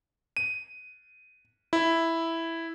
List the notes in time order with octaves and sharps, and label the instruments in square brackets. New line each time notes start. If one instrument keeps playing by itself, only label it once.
[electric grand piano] D#7
E4